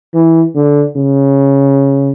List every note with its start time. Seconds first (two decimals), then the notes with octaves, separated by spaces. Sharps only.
0.14 E3
0.55 D3
0.97 C#3